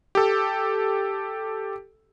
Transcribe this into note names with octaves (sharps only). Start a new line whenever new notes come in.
G4 A4